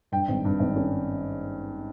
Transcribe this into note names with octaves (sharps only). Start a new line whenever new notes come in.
G2 G5
G#1
G2
G#1
C#4